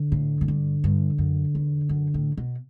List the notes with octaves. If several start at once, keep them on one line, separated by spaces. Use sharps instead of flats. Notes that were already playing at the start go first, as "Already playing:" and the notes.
Already playing: D3
A2
A2
G2
G2
F#2
E2
F#2
A2
B2